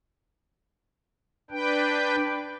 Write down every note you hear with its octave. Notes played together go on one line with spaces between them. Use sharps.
D4 B4 G5